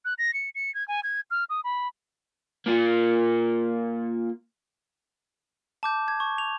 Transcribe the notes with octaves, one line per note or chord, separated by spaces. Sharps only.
F#6
A#6
C#7
C#7
G#6
G#5
G#6
F6
D#6
B5
A#3 F4
A5 D6 G6
G#6
C#6
F7